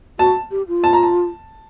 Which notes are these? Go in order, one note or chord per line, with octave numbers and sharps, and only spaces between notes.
F#4 A5
G4
F4
A5
A#5
A5